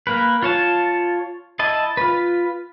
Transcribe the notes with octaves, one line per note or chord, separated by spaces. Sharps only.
A#3 A#4 B4
F4 C#5 A5
E4 D#5 A5
F4 B4